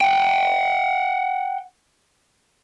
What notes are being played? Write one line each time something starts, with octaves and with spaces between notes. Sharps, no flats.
F#5 G5